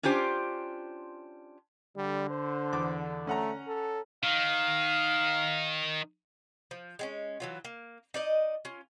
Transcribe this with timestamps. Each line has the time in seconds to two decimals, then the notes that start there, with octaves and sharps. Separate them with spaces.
0.03 C#4 D4 F4 G4 C5
1.97 D3 G3
2.30 C5
2.73 E2 D6
3.27 A3 C#4 F#5 A#5
3.67 A4
4.24 D#3 F5
6.71 F3
6.99 G#3 C4 C#4
7.40 E3 F#3 F4
7.65 A#3
8.14 D#4 D5 D#5
8.65 C#4 F4